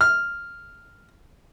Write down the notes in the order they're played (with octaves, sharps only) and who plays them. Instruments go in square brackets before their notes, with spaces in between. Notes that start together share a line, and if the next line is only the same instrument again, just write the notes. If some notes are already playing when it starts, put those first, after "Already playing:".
[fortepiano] F6